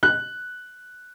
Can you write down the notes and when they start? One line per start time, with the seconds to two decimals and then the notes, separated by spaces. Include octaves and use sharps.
0.03 F#6